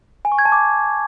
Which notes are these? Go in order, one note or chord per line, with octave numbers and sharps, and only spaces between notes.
G#5
C#6
G#6
A5
D6